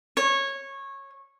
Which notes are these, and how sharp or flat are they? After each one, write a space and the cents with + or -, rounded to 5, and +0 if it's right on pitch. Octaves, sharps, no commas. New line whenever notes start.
C#5 -15